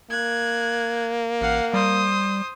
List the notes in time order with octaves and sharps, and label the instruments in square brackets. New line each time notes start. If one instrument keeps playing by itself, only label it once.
[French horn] A#3 [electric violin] F#6 G#6
[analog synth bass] A1 [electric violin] F5 F#5
[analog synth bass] G3 [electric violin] C5 D#6